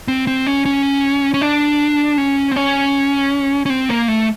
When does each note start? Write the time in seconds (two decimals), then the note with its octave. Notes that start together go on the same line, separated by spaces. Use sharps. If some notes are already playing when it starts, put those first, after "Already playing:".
0.08 C4
0.27 C4
0.47 C#4
0.65 C#4
1.34 C#4
1.41 D4
2.18 C#4
2.51 C4
2.56 C#4
3.66 C#4
3.70 C4
3.89 A#3
4.08 A3